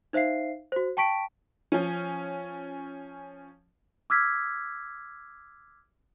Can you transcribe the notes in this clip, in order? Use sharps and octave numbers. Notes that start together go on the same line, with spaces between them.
D#4 C5 E5 F5 C7
F#4 C5
G5 A5 C#6 B6 D7
F3 C#4
D6 E6 F6 G#6 B6